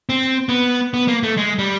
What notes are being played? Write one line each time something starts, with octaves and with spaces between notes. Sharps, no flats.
C4
B3
B3
A#3
A3
G#3
G3